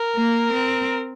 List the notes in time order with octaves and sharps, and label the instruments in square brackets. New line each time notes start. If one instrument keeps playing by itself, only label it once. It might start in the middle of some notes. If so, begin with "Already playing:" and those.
Already playing: [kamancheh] A#4
[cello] A#3
C4